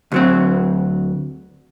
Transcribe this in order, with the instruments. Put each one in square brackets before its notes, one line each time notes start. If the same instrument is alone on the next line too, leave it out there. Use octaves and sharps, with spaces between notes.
[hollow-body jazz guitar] D2 F#3 C4